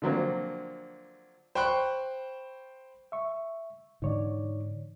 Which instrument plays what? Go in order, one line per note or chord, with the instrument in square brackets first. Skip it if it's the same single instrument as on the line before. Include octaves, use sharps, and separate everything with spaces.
[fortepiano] D3 F3 F#3 A#3 C4
[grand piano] C5 G5 B5 C#6 F#6
[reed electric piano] E5 C#6
[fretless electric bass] G#2 D3 E3 [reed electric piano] D#4 C#5 D5